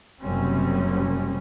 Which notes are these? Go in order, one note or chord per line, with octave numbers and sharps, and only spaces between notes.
F#1 F#2 C3 G3 C4 C#4